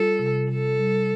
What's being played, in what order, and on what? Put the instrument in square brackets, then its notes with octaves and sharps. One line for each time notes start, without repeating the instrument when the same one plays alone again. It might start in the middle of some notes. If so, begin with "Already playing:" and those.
Already playing: [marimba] G3 F4 [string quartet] A4
[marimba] C3
[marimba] C3 [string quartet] A4
[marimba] G3